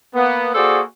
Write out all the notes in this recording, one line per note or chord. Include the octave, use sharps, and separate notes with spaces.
A#3 B3
A#3 F#4 G#4 A4 C5 D5